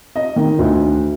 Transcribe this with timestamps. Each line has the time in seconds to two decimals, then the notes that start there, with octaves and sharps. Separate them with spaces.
0.16 D#5
0.36 D#3
0.59 D2